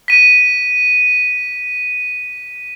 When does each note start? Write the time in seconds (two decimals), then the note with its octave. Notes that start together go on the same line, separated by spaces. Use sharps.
0.08 B6 D#7